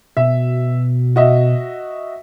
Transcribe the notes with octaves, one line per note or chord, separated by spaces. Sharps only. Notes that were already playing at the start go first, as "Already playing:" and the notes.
B2 E5
F#4 D#5 E5